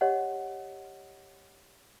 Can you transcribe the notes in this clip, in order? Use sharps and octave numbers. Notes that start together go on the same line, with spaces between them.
G4 C#5 D#5 F#5